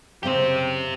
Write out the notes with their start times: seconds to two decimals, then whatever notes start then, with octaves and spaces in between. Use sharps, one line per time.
0.23 F#2 C#3 C4 G4 C5